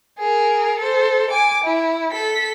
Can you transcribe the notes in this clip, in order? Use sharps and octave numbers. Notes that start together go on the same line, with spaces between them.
G#4 A#4
A4 C5
G#5 D6
E4
A4 B6